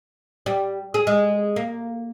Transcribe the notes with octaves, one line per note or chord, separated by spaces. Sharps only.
G3
G#4
G#3
A#3